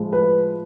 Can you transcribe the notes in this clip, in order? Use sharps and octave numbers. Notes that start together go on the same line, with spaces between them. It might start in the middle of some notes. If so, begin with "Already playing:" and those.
Already playing: A2 F3 G#3
B4